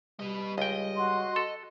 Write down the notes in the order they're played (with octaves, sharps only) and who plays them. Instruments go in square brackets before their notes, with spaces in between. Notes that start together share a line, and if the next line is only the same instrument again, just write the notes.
[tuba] G3 [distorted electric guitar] B4 D#5
[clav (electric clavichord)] C#2 G5 [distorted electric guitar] D#5
[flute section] F#4 C6
[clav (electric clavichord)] A4